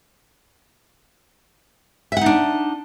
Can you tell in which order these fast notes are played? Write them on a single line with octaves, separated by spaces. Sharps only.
E5 F#5 D#4 D4